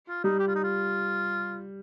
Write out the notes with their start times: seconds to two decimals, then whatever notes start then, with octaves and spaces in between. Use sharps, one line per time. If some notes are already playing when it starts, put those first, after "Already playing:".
0.09 F4
0.24 G3 D#4
0.39 G4
0.47 F4
0.55 D#4
0.64 F4